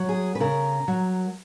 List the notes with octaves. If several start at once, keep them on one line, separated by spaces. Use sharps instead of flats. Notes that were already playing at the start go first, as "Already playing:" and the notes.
Already playing: F#3
G#4
B4
C#3 A#4
F#3